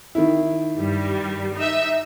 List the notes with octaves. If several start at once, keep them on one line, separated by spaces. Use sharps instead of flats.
D#3 E4
G2 G3
D#4 E5